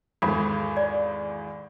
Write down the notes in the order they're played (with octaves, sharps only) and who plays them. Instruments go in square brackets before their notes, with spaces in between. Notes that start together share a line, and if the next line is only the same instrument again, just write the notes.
[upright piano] G#1 E2 G#2 [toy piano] A4 B5
[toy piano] D5